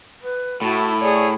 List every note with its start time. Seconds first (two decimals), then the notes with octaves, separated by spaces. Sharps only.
0.21 B4
0.62 A2 E4 F#4 A5
1.00 G#4 C#5 D5